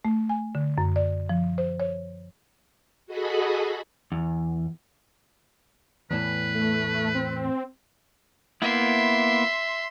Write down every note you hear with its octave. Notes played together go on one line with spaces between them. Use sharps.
A3
G#5
D3
F#2
D5
F3
C5
C#5
F#4 G#4 A4 D#5 B5
E2
E2 A2 E3 B4
A3
C4
A#3 B3 E4 E5 C6